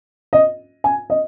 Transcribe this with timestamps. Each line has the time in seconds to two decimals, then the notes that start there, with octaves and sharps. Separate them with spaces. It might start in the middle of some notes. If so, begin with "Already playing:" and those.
0.33 D#5
0.84 G#5
1.10 D#5